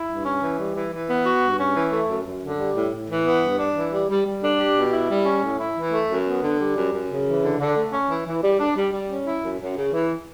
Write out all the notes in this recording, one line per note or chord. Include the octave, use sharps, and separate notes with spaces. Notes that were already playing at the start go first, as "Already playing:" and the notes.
Already playing: E4
G2
C#4
E3
G3
E3
E3
B3
F#4
G2
C#4
E3
A3
F#2
F#2
D3
G3
A2
A2
E3
B3
G2
D4
E3
G3
G3
G3
D4
G4
B2
E4
G3
C#4
A2
E4
E3
A3
F#2
B3
D3
G3
F#2
F#2
C#3
E3
D3
D3
A3
C#4
E3
E3
G3
D4
G3
G3
C#4
E4
F#2
F#2
C#3
E3